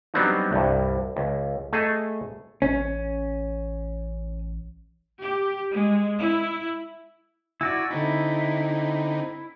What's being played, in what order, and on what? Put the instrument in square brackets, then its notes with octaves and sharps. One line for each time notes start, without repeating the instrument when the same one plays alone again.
[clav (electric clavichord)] F#3 G3 B3 C4 D4 D#4
C2 G2
C#2
A3 G#4 A4 D#5
[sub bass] A1 [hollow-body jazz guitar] C#4
[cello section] G4
G#3
E4
[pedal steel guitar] E4 F#4 D5 [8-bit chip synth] G#5 E6
[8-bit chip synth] D3 C4 D#4 [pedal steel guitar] E4